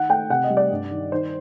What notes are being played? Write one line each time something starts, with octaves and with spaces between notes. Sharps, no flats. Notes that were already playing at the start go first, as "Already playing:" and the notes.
Already playing: D#3 F#5
A3 G5
C3 F#5
D#5
G3
D5
G2
D#3
D#3 C5